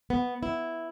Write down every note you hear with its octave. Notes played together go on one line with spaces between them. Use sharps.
B3
E4